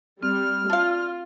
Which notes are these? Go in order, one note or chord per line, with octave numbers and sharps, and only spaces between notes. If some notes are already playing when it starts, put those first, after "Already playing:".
G3 C4 F6
D4 F4 F5